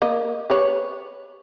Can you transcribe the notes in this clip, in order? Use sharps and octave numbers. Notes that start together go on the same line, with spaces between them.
A#3 D#5
G4 B4 C#5